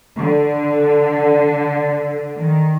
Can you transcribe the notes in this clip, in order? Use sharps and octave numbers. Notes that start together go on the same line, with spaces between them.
D3
D#3